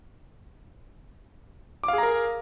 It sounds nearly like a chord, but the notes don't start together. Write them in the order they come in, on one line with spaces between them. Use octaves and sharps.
D6 F5 G#4 A#5 A#4